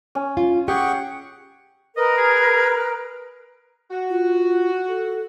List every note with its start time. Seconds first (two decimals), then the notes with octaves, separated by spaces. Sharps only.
0.15 C#4
0.37 F4
0.68 G4 G#4 F#5 G5 C#6
1.97 A#4 B4 D#5
2.18 G#4
3.91 F#4
4.10 F4
4.89 A4